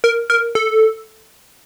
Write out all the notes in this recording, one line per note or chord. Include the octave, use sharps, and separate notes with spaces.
A#4
A#4
A4